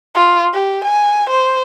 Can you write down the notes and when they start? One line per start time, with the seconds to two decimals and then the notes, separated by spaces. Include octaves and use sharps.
0.15 F4
0.53 G4
0.84 G#5
1.30 C5